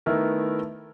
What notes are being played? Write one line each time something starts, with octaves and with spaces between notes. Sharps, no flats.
D#3 A3 B3 E4 A#4